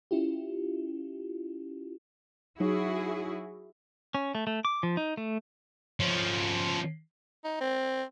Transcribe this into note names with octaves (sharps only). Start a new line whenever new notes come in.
C#4 E4 F4 G4
F#3 D#4 E4 F#4 G#4 C#5
C#4
A3
A3
D6
F3
D#4
A3
F3 C#4
D#4
C4